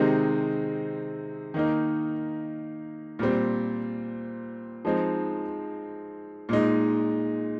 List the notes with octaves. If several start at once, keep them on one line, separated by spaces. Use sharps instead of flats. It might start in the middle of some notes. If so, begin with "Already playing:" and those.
Already playing: C3 D#3 G#3 C4 D#4
D#3 A#3 D#4
A#2 G3 C4
F3 G#3 C4 D#4
A#2 G#3 D#4